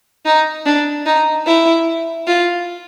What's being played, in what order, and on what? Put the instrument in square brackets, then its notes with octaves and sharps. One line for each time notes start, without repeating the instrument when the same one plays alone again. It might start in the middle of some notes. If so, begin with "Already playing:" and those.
[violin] D#4
D4
D#4
E4
F4